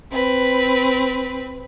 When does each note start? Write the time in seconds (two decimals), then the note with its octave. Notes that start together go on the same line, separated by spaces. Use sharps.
0.12 C4 B4